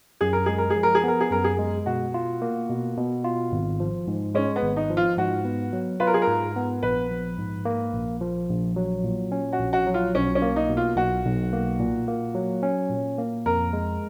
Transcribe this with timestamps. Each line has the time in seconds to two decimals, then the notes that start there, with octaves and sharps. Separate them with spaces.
0.21 F#2 G#4
0.33 A#4
0.46 G#3 G#4
0.58 A#4
0.70 G#4
0.76 F3
0.83 A#4
0.95 G#4
1.04 B3 A#4
1.20 G#4
1.31 F#2 A#4
1.44 G#4
1.59 G#3
1.86 B2 F#4
2.14 F4
2.42 A#3
2.69 B2
2.97 B2
3.24 F4
3.52 G#1
3.80 F3
4.07 G#2
4.35 G#3 C#4
4.56 B3
4.63 G#1
4.76 D#4
4.90 F3
4.97 F4
5.17 G#2 F#4
5.45 B3
5.73 F#3
6.00 F4 B4
6.07 A#4
6.14 G#4
6.22 A#4
6.28 G#2
6.56 B3
6.83 A#1 B4
7.11 F3
7.38 G#2
7.65 A#3
7.94 A#1
8.21 F3
8.49 A#1
8.76 F#3
9.04 A#2
9.32 C#4
9.53 F#4
9.59 A#1
9.73 F#4
9.87 F#3
9.94 F4
10.15 B1 C#4
10.35 C#4
10.42 A#3
10.56 D#4
10.69 B2
10.77 F4
10.96 B1 F#4
11.25 B1
11.53 A#3
11.80 A#2
12.08 A#3
12.35 F#3
12.63 C#4
12.90 A#2
13.18 A#3
13.46 F2 A#4
13.73 G#3